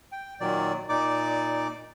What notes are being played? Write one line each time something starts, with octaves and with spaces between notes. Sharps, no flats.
G5
A#2 D#3 F#3 D5
A#2 D#4 D5 D6